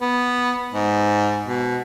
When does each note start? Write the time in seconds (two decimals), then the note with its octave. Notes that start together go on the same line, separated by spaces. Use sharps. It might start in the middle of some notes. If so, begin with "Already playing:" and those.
0.01 B3
0.73 G#2
1.48 B2